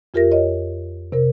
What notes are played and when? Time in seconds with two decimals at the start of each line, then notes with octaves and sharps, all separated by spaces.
0.14 F2 F4 G4 A#4 E5 A#6
0.31 F4 C#5 D#5
1.12 C3 A#4